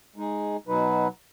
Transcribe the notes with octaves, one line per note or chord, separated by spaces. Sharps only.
G#3 D#4 G#4
B2 F#3 D#4 B4